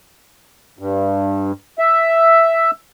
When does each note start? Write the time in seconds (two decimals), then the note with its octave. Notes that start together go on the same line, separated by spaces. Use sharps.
0.79 G2
1.79 E5